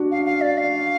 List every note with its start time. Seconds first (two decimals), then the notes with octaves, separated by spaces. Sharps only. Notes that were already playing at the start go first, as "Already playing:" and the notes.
Already playing: D4 F#4
0.11 F5
0.26 F5
0.41 D5
0.58 F5